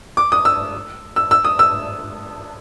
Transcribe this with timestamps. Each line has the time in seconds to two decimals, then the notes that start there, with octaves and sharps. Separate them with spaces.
0.17 D6
0.32 D#6
0.45 E6
1.16 E6
1.31 E6
1.45 D#6
1.59 E6